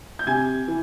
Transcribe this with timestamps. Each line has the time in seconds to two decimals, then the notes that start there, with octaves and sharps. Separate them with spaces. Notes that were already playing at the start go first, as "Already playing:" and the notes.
0.19 G6
0.27 C3 G#5 G#6
0.68 E3